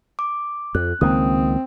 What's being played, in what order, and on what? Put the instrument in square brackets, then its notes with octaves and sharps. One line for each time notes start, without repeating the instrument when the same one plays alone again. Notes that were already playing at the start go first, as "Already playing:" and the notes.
[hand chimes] D6
[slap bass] F2 [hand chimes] F#6
[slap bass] C#2 D#3 A#3 [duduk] C4 [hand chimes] D#6